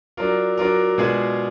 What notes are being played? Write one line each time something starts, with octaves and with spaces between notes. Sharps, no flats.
F#3 D4 F4 A#4
F#3 D4 F4 A#4
B2 G#3 D4 F4 G#4